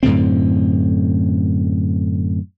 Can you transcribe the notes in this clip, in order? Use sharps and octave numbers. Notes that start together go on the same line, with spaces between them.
F#2 A2 D3 C4